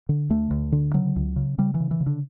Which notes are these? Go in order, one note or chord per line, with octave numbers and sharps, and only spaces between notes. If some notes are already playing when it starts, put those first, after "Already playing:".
D3
D2 A3
D2
D3
C#3 F#3
C#2
C#3
C#3 G3
E3
C#3
E3
C#3
D3